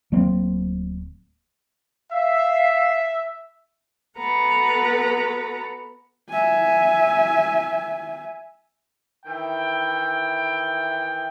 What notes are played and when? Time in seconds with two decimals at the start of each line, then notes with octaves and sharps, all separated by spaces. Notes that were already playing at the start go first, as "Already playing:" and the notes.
0.12 D1 F#3 A#3 C4
2.12 E5 F5
4.15 B3 F#4 A4 B4 F#5 A#5
6.30 E5 G#5
9.26 D#3 E3 E5 G5